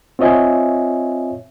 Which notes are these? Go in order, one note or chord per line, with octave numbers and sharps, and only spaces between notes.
C4 F4 C#5 D#5 E5 G#5